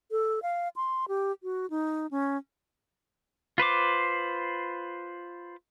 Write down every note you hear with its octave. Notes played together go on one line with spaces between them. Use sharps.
A4
F5
C6
G4
F#4
D#4
C#4
F4 B4 C5 D6